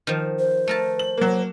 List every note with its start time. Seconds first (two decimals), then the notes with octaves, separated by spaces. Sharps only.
0.07 D#3 F3
0.39 C5
0.68 A3 A#4 A5
0.99 F#7
1.18 F#3 A#3